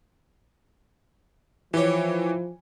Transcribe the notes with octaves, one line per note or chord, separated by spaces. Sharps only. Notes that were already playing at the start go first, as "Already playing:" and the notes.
E3 F3 G4 C#5